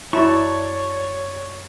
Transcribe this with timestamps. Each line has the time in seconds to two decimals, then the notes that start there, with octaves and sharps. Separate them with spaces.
0.13 F#2 E4 F#4 C#5 D5 A5 B5 C#6